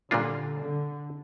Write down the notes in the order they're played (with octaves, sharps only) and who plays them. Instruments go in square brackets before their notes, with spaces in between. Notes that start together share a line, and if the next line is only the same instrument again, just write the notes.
[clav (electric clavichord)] A#2 G3 A#3 D4 F4 [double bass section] D3
[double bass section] D3